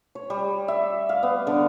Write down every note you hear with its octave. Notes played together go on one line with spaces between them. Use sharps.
C#5
G3
E5
F5
B3
D3